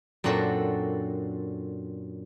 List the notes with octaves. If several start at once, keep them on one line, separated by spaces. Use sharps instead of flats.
F#2 A#2 C4 D4 F#4 A4